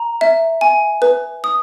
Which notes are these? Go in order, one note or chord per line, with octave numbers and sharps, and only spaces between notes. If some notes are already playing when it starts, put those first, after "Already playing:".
Already playing: A#5
E5
G#5
B4
D#6